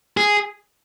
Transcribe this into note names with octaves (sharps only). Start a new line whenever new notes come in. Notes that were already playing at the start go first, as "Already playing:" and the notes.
G#4